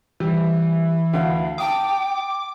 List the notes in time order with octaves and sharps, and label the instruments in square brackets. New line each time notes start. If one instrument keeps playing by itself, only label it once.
[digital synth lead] E3 [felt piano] G3
[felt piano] D2 [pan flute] F5
[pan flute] G5 [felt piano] A5 D#6 [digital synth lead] D6